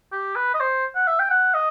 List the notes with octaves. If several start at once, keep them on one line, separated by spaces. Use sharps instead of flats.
G4
B4
D#5
C5
F#5
E5
G5
F#5
D#5